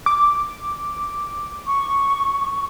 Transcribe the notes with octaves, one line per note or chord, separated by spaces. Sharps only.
D6
C#6